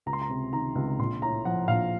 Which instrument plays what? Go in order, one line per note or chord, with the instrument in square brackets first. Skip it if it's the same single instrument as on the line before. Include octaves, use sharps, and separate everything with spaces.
[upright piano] C#2 A#5
C6
A#5
C3
D#3 A#5
C#2
A#1 C6
A2 A#5
F3 F#5
A#1 F5